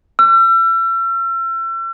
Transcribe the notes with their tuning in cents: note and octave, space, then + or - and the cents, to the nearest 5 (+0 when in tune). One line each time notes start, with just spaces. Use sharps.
E6 +40